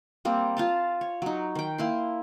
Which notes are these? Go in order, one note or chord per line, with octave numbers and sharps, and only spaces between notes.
G3 A#3 C4
F4 F5 A5
C#5
F#3 D#4
D#3 G5
A#3 E4 C6